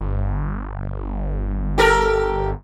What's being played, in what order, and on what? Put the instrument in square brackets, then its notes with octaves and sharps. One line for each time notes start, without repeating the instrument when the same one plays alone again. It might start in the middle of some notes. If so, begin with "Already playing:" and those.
[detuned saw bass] G1
[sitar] G4 A4 A#4